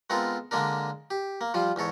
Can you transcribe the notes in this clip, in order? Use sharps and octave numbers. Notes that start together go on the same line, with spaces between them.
G#3 B3 C4 F4 A4 A#4
D3 G#3 A#3 D4 A#4
G4
A#3
F3 G3 F4
E2 G#2 A4 C#5